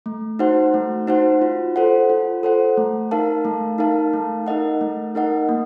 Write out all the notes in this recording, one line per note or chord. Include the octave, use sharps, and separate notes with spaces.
A3
D#4 F#4 C5 F#5
A3
D#4 F#4 C5 F#5
F4
A4 C5 F#5
F4
A4 C5 F#5
A3
D#4 A#4 F5 A5
A3
D#4 A#4 F5 A5
A3
D#4 A#4 D#5 F#5
A3
D#4 A#4 D#5 F#5
A#3